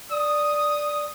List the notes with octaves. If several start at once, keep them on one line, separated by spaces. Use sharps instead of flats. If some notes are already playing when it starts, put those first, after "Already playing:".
D5 D#6